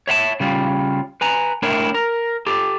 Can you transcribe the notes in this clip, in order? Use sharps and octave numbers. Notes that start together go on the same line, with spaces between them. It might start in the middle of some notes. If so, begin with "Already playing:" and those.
C#5 E5 F5 A5
C#3 G3 F4
B4 G#5 A#5
A3 D4 E4 A#4 C#5 G5
A#4
G4 A4